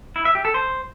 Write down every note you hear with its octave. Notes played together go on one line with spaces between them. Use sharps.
E4
E5
G4
A4
C5